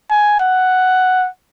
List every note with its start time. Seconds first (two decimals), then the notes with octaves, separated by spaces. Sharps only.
0.10 G#5
0.40 F#5